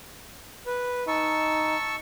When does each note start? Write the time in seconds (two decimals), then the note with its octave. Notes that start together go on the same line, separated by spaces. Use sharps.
0.66 B4
1.08 D#4 A5 C#6 E6